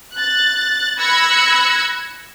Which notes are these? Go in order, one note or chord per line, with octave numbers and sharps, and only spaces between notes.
F#6 A6
B5 E6 F#6 G#6 A#6 C#7